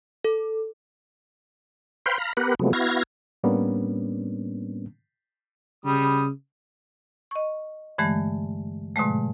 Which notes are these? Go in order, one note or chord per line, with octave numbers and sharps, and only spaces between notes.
A4
B4 C5 F5 G5 B5 C6
F5 A#5 B5
B3 G4 A#4 B4 F#5
C3 F3 F#3 G#3 A3 B3
B3 E4 F#4 F5 G#6 A#6
A2 G3 A#3 B3 C#4 D4
C#3 G3 D#6
D#5 C#6
G2 D3 E3 G#3 A3
G#2 B2 D3 F3 G#3 A3